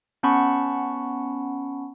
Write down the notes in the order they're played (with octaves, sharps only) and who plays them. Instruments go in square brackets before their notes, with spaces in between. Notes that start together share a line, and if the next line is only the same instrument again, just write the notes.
[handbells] B3 C#4 F#5 A5 B5 C#6